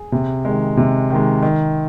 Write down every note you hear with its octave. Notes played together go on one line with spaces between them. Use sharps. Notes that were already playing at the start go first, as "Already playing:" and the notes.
Already playing: G#4
C3
D#3 G#3
C3
D#3 G#3
D#3